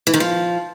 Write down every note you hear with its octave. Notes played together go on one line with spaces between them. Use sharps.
E3
D#3
F3